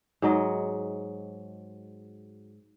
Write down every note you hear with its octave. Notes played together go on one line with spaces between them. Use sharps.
G#2 F#3 D#5